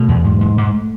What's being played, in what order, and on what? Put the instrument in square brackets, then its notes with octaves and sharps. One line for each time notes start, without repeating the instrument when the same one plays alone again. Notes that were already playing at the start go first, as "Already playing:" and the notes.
Already playing: [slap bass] B2 A3
E2
G#2
G#2
G#2